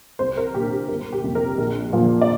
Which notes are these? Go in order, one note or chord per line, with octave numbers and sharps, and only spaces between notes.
C2 C5
A#4
A#2 A#3 D4 G4
G4
G1 A#4
G4
F2 C3 A#3
A#4
A#1
A#2 F3 A#3
D5